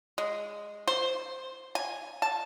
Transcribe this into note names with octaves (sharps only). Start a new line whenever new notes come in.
G#3
C5
G#5
A5